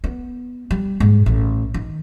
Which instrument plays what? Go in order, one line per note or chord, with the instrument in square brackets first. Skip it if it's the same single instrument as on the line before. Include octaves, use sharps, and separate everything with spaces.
[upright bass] B3
G3
G#2
A1
D#3